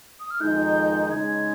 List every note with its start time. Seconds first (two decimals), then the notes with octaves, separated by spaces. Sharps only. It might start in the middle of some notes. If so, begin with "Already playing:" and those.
0.20 D#6
0.31 F6
0.41 F2 D#3 G#3 D#4 G6
1.07 G6
1.11 C#3 G#3 D#4 G#6